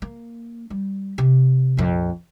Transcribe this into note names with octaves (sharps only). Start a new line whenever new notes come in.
A#3
G3
C3
A#1 F2